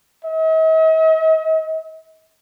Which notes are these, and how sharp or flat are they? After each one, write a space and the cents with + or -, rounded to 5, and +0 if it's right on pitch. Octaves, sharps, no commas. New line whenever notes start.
D#5 +45